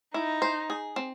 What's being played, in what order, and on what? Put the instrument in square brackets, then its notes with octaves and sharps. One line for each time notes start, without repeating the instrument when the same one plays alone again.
[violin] D#4 [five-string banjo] E4
[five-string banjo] C5
G#4
C4